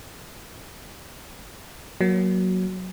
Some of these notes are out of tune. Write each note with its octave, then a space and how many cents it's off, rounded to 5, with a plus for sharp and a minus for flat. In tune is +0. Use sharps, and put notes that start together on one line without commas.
F#3 +0 A#3 +15